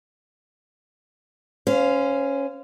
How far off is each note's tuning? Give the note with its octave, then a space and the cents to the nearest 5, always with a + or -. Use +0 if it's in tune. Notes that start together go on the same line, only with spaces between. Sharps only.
C#4 +0 C5 -30 F5 +0